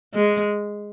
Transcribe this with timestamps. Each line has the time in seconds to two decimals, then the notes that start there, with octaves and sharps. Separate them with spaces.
0.15 G#3